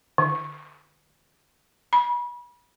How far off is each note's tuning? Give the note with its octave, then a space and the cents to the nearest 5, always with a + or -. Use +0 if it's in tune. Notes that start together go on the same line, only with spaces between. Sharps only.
D3 +25
B5 -30